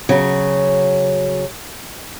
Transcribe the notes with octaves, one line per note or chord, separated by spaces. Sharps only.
C#3 F#3